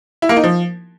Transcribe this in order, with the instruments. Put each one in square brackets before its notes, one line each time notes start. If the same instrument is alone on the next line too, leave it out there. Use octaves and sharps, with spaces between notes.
[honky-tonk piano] E4
A#3
D#4
F3